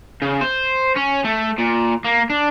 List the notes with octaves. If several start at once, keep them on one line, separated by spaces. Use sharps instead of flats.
C#3
C5
C#4
A3
A#2
A#3
D4